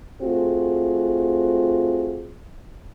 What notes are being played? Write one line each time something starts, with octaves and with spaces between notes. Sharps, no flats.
A3 C4 F4 F#4 G#4